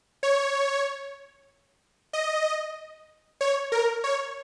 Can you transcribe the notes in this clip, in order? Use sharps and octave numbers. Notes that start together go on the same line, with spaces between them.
C#5
D#5
C#5
A#4
C#5